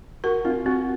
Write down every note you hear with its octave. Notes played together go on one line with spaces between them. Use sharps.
F#4 A#4
C4 F4
C4 F#4